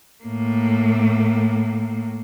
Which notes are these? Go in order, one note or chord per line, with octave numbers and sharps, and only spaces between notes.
A2 A#3